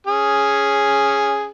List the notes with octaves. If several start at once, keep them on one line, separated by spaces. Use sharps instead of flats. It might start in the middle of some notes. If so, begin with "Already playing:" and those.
C#4 G#4